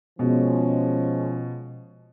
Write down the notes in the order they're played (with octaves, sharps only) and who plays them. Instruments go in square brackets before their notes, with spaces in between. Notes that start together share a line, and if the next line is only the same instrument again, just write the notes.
[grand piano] B2 [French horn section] F3 G#3 C#4